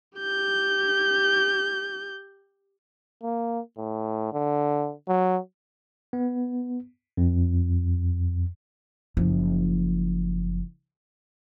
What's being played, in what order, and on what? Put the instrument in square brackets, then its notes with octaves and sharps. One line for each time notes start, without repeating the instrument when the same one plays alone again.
[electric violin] G4 G6
[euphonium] A#3
A2
D3
F#3
[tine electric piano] B3
F2
[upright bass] F#1 F3